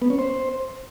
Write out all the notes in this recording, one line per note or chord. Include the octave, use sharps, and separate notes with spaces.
B3
C#4
C5